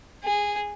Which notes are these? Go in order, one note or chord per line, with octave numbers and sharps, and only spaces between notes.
G#4